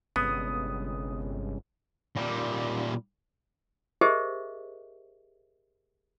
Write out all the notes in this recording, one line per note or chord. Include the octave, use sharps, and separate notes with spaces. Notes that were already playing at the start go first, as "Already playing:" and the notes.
G1 C3 G#3 B3 C#4 D#6
A#2 G3
G4 G#4 A#4 C5 D#5 E5